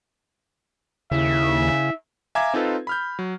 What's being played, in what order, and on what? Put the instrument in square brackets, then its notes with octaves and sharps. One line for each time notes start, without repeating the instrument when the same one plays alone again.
[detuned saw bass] D#2 [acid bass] C#3 [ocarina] E4 [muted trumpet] E5
[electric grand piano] E5 F5 G#5 A#5 D6 G#6
C4 D#4 F4 A4 B4
B5 F6 G6
F#3